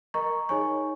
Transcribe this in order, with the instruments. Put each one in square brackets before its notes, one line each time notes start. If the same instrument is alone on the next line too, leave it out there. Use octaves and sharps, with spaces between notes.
[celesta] A#4 D#5 A#5 C#6
D#4 G#4 C#5 G#5 C#6